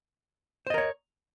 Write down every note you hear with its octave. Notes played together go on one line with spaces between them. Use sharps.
A#4 C5 C#5 D#5